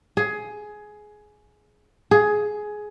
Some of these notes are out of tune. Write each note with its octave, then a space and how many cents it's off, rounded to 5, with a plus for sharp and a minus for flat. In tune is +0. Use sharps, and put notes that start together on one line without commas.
G#4 +15
G#4 +15